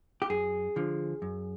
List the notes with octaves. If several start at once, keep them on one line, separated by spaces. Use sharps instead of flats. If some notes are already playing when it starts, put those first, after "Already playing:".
G4
F#2 G#4
D3 F3
F#2